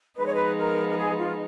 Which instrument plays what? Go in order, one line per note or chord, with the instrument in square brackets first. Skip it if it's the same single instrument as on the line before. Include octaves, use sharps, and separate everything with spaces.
[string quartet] F3 G#3 B3 D#4 [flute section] B4
[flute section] C#5
B4
A#4
A#4
G#4
F4